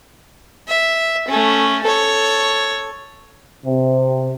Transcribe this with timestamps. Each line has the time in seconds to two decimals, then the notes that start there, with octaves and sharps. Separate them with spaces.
0.68 E5
1.28 A3 C#4
1.83 A4 C#5
3.66 C3